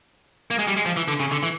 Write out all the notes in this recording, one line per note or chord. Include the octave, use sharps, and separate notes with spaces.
A#3
G#3
G3
G#3
F3
E3
D3
C#3
D3
E3